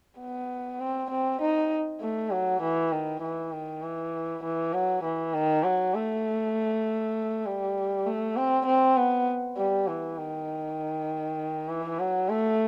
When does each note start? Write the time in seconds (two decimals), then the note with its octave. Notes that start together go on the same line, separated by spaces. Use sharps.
0.20 B3
0.80 C4
1.10 C4
1.41 D#4
2.01 A3
2.31 F#3
2.62 E3
2.92 D#3
3.22 E3
3.52 D#3
3.83 E3
4.43 E3
4.73 F#3
5.03 E3
5.34 D#3
5.64 F#3
5.94 A3
7.46 G3
8.06 A3
8.36 C4
8.66 C4
8.97 B3
9.57 G3
9.87 E3
10.18 D#3
11.69 E3
11.99 F#3
12.30 A3